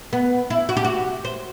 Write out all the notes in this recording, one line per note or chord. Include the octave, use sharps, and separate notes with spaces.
B3
E4
F#4
G4
F#4
C5